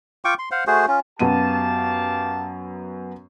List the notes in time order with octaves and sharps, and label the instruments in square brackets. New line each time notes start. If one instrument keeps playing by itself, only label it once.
[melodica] F4 G5 C#6 D6
C6
C5 F5 F#5
A3 F#4 G#4 C5
C#4 F4
[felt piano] F#2 B3 D#7 [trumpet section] G4 F5 A5